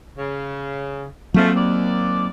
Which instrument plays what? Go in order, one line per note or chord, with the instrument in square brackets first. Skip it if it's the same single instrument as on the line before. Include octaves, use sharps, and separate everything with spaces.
[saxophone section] C#3
[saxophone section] G#2 F3 A3 [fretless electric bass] F#3 A#3 C4
[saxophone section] D#2 D5